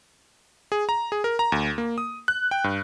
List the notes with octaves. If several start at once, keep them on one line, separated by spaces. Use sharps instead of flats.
G#4
A#5
G#4
A#4
A#5
D2
A#3
D#6
F#6
G5
G2